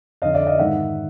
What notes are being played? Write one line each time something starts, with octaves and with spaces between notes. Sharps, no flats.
F2 D3 D#5 F5
D5 E5
D#5 F5
G#2 D#3 E5 F#5